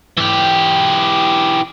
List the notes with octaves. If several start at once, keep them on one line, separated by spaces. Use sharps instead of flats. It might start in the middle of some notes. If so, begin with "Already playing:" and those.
E3 G4